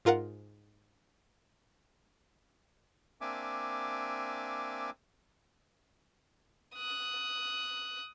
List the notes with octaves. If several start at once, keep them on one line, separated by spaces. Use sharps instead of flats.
G#2 F4 A#4 F5 F#5
A#3 C4 D4 E5 G#5 D6
D#6 F#6